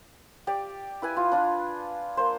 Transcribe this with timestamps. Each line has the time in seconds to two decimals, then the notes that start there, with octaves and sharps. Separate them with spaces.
0.47 G4 D5
1.02 E4 B4 G#5
1.16 F4
1.32 D4 F4
2.17 A#3 C5